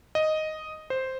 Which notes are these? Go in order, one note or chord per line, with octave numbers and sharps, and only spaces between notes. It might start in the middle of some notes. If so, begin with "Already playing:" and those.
D#5
C5